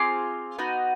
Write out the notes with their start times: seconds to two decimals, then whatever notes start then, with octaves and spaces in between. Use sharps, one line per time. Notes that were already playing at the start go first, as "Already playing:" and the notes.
Already playing: C4 F4 G#4 C6 D6
0.59 B3 D#4 F#4